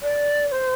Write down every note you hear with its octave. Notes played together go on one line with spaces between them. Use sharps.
D5
D5
C5